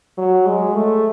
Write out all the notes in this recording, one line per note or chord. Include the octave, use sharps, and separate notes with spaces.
F#3
G#3
A3